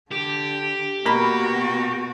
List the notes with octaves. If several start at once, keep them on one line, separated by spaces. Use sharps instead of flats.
D3 G4
B2 A#3 F#4 B5